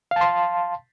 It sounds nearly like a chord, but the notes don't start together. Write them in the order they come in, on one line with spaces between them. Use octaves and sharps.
F5 A5 C6